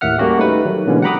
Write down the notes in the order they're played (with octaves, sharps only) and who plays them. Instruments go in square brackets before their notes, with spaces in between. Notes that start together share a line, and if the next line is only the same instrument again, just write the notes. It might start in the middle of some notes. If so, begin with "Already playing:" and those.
[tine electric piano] D#2 A2 A#3 E5 F#5 F6
G3 A3 A#3 C#4 F#4 G4
A3 D#4 B4
D#3 F#3 G4
B2 D3 E3 G#3 A#3 C#4
F#5 G5 A#5 B5 D6 D#6